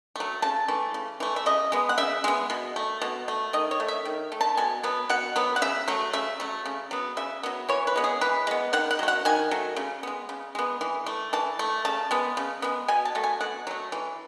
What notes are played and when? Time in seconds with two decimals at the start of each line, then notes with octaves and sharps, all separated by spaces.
0.16 F#3 A3
0.42 C#3 A5
0.68 E3 A3
0.94 C#3
1.20 E3 A3
1.36 E5
1.46 C#3 D#5
1.72 G#3 B3
1.89 F#5
1.98 C#3 E5
2.24 G#3 B3
2.50 B2
2.76 A3
3.02 B2
3.28 A3
3.53 D#3 D#5
3.71 C#5
3.80 A3
3.88 E5
4.05 D#3
4.32 A3
4.41 A5
4.57 B2 G#5
4.83 F#3 B3
5.09 B2 F#5
5.36 F#3 B3
5.56 F#5
5.62 C#3 E5
5.88 F#3 A3
6.13 C#3 E5
6.40 F#3 A3
6.66 C#3
6.91 F#3 B3
7.17 C#3 E5
7.43 F#3 B3
7.69 E3 C#5
7.87 B4
7.96 G#3 B3
8.04 G#4
8.21 E3 B4
8.47 G#3 B3
8.73 D#3 F#5
8.91 F#5
8.99 F#3 A3
9.08 F#5
9.25 D#3 G#5
9.51 F#3 A3
9.76 C#3
10.03 G#3 B3
10.29 C#3
10.55 G#3 B3
10.81 E3
11.06 A3
11.33 E3 A5
11.59 A3
11.85 C#3 A5
12.11 G#3 B3
12.37 C#3
12.62 G#3 B3
12.88 B2 G#5
13.05 A5
13.15 F#3 A3
13.24 G#5
13.41 B2 F#5
13.67 F#3 A3
13.92 E3